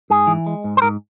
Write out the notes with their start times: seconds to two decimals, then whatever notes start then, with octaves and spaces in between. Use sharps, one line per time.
0.10 G#2 G#4
0.27 E3
0.46 G#3
0.64 G#2
0.77 C5
0.82 G#2 A#4